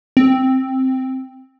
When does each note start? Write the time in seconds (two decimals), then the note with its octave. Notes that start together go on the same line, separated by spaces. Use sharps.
0.17 C4